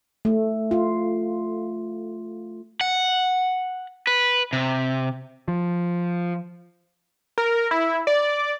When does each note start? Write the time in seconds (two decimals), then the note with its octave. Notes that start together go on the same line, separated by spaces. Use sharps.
0.25 A3
0.71 F4
2.81 F#5
4.07 B4
4.53 C3
5.48 F3
7.38 A#4
7.71 E4
8.07 D5